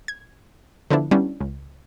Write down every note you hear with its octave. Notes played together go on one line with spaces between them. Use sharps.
G#6
D3 F3 B3 D4 E4
G3 B3 C#4 D4 E4
C#2